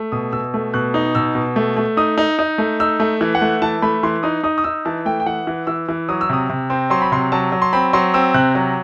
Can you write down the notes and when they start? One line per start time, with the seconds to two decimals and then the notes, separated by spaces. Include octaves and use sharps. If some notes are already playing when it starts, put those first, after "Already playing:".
Already playing: A3
0.12 B2 D#6
0.33 B2 E6
0.54 A3
0.74 B2 F#6
0.94 D#4
1.15 B2 E6
1.35 B2
1.56 A3
1.76 A3
1.97 D#4 D#6
2.18 D#4
2.39 D#4
2.58 A3
2.80 D#4 E6
3.00 A3
3.21 E3
3.35 F#5
3.41 A3
3.62 E3 A5
3.82 A3 B5
4.03 E3 C6
4.23 D#4 D#6
4.43 D#4 D#6
4.58 D#6
4.64 D#4 E6
4.85 E3 A5
5.06 A3 G5
5.20 G5
5.26 E3 F#5
5.47 E3
5.67 E3 E6
5.89 E3
6.09 F#3 D#6
6.21 E6
6.29 C3 D#6
6.49 C3
6.70 C4
6.90 F#3 C6
7.02 B5
7.12 C3 C6
7.32 F#3 A5
7.52 F#3
7.62 C6
7.73 C4 B5
7.93 F#3 C6
8.14 C4 E6
8.34 C3 F#6
8.55 F#3